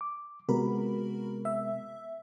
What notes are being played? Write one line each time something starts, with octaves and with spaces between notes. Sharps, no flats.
D6
C3 G#3 B3 F#4 A#4 B5
E5